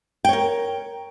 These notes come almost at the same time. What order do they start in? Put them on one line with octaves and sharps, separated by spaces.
G5 C#5 A#4